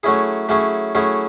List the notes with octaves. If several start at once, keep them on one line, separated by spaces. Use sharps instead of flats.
F#3 A3 C#4 E4 G#4
F#3 A3 C#4 E4 G#4
F#3 A3 C#4 E4 G#4